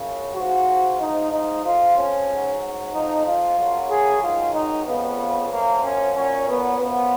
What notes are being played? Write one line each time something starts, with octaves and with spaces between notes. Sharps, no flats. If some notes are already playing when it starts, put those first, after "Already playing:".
Already playing: F#2 C#3 F3
G#2 F3 F#4
G#2 F3 D#4
D#4
F2 F3 F4
C#4
G#2 F#3
F2 F3 D#4
F4
F#2 C#3 F#3
G#4
G#2 D#3 F#3 F4
D#4
F2 C#3 F3 B3
F#2 F3 A#3
C#4
A#2 F#3 C#4
B3
F#2 F3 B3